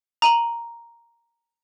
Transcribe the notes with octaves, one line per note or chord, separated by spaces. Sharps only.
A#5 D#7 F#7